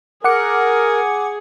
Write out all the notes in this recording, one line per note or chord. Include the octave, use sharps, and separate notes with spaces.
G#4 A#4 F#5 D6 C#7